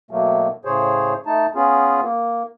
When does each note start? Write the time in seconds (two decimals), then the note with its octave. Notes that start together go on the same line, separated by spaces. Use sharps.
0.11 B2 F#3 A3 A#3
0.65 A2 C#3 G#4 C5 C#5
1.26 A3 D#4 A5
1.55 B3 C#4 F4 G#4
2.02 A#3